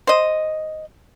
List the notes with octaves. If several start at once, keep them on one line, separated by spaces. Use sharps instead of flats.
C5 D#5